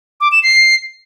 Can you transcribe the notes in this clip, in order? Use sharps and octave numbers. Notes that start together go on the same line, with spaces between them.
D6
E7
C7